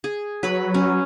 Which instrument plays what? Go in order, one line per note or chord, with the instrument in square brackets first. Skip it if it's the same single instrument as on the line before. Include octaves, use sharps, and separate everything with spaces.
[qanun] G#4
[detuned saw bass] F#3 [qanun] B4 B5
[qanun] C#4